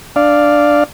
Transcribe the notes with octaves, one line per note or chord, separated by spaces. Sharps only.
D4 D5 F5